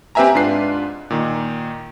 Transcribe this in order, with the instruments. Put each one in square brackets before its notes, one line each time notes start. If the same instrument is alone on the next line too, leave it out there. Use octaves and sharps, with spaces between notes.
[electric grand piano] C4 G4 B4 E5 G#5 A#5
G#2 D4 F4 B4 C7
A#2 D#3